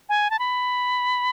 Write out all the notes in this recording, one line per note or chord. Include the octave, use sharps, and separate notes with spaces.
G#5
A5
B5